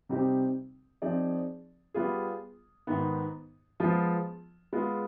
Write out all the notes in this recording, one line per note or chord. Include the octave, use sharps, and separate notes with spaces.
C3 G3 C4 D#4 G4
F3 C4 D#4 G#4 D5
G3 B3 F4 G#4
G#2 D#3 B3
F3 G#3 B3 F4
G#3 B3 F4